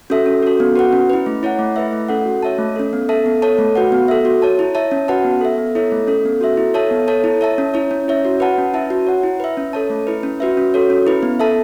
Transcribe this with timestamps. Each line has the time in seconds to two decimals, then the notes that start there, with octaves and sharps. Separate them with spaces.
0.10 C#4 F#4 A4 E5
0.26 C#4
0.42 F#4 A4
0.60 B3
0.76 F#4 B4 F#5
0.93 C#4
1.10 E4 B4
1.26 A3
1.43 E4 C#5 F#5
1.59 A3
1.76 E4 B4 E5
1.93 A3
2.09 C#4 A4 F#5
2.25 F#4
2.43 C#5 E5 A5
2.58 A3
2.76 C#4 A4
2.93 B3
3.09 A4 E5 A5
3.26 B3
3.42 A4 C#5 A5
3.58 A3
3.75 F#4 B4 F#5
3.92 B3
4.08 A4 E5
4.25 F#4
4.42 C#5 A5
4.59 E4
4.75 C#5 E5 A5
4.91 C#4
5.08 F#4 B4 F#5 A5
5.25 B3
5.41 A4 E5
5.58 B3
5.75 E4 A4 C#5 E5
5.92 A3
6.07 C#4 A4
6.25 B3
6.41 F#4 A4 E5
6.57 E4
6.74 A4 C#5 E5 A5
6.91 B3
7.08 A4 C#5 A5
7.24 E4
7.41 C#5 E5 A5
7.58 C#4
7.74 E4 C#5
7.91 C#4
8.08 E4 C#5 E5
8.25 F#4
8.40 B4 F#5 A5
8.58 C#4
8.74 E4 B4 E5 A5
8.90 F#4
9.07 C#5 F#5
9.23 E4
9.40 B4 E5
9.57 C#4
9.73 A4 C#5 A5
9.90 A3
10.07 E4 B4
10.23 C#4
10.40 F#4 B4 E5
10.57 C#4
10.74 F#4 A4 C#5
10.90 C#4
11.07 E4 B4
11.23 B3
11.40 A4 E5 A5